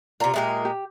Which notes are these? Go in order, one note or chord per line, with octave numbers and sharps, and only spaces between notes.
C3 F4 D5 A#5
A#2 G#3 G4 A#4 E5
G4